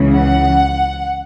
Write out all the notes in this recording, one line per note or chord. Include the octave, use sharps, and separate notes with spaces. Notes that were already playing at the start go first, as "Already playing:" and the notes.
Already playing: C#2 C#3 E3
F#5